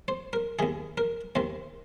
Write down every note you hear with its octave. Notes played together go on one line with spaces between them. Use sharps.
C5
A#4
D#2 D#3 G#4
A#4
D#2 D#3 C5